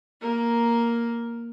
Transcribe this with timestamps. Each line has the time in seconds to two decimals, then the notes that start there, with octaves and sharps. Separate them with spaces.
0.21 A#3 A#4